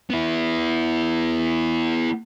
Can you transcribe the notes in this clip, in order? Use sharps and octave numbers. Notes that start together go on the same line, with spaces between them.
B3 E4